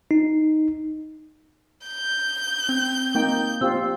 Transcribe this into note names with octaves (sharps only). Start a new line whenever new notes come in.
D#4
G6
C4
A#3 D#4 G5
C4 F4 G4 E6